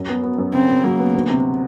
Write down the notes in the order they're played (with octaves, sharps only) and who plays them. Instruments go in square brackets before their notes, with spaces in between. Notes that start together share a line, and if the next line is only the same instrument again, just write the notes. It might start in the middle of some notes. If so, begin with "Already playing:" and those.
Already playing: [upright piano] F#2
B3
B3
F#2
[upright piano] C#3 [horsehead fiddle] C4
[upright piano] C#3
[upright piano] F#3 [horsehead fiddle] A#3
[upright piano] B3
D2
C3